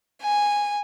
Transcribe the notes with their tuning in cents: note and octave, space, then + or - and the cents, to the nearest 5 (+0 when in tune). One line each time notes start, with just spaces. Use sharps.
G#5 -10